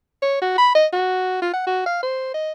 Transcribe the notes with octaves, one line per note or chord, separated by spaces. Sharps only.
C#5
F#4
B5
D#5
F#4
F4
F#5
F#4
F5
C5
D#5